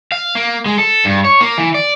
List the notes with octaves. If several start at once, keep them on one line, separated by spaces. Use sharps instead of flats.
F5
A#3
G#3
A4
G2
C#5
A#3
E3
D5